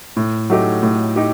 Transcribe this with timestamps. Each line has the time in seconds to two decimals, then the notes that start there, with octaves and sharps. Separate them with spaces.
0.17 A2
0.50 F#3 A3 D#4 G4
0.83 A2
1.16 D#4 G4